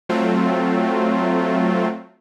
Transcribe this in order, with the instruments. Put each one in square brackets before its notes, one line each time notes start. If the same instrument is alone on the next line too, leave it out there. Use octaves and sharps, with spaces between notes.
[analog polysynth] F#3 A3 C4 F4